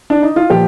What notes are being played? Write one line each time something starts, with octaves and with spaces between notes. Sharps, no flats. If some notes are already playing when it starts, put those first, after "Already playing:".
D4
D#4
F4
A#2 F3 G4